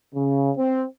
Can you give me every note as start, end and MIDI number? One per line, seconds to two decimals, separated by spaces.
0.15 0.52 49
0.58 0.83 60